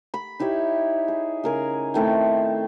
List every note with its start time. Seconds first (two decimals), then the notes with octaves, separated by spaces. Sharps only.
0.14 B5
0.39 D#4 E4 G4 C#5
1.08 G#4
1.44 C#3 A#4 G#5
1.94 D#3 A3 C4 E4